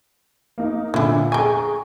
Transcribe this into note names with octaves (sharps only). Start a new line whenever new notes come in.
A#3 D#4
A#2 D3 C#4 E4
G#4 G5 G#5 A#5 C#6